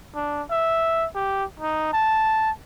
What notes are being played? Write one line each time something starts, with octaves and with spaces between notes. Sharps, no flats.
D4
E5
G4
D#4
A5